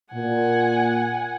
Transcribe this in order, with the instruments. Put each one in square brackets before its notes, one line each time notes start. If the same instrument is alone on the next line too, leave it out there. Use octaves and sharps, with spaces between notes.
[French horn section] A#2 [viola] F#5 G#5